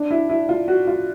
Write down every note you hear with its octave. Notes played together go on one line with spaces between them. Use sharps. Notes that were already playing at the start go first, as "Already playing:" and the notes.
Already playing: D4
E4
E4
F4
F#4
F4